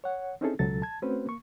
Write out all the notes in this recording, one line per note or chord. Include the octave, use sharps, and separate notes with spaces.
C#5 F#5
C4 C#4 D#4 E4 G#4 A4
C#2 B2 F#3 A4 A6
A5 G#6
A3 C4 C#4 F#4 B4 C5
A#3 C#6